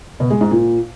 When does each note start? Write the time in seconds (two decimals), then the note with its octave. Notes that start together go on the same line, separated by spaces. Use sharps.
0.20 B2
0.30 G#3
0.41 G#2
0.51 A#2